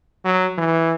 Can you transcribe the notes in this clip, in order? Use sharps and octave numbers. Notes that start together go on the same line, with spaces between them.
F#3
E3